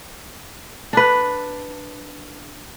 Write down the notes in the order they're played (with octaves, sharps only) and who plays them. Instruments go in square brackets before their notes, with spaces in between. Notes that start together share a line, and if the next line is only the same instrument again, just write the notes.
[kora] D4 B4